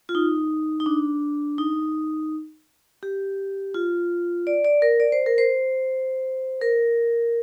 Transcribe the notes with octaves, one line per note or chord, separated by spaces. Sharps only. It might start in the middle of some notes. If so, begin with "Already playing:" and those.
F4
D#4
D#4
D4
D#4
G4
F4
D5
D5
A#4
D5
C5
A#4
C5
A#4